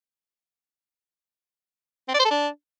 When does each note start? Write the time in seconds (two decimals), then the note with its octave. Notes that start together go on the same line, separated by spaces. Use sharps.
2.08 C4
2.14 D5
2.19 C5
2.25 A4
2.30 D4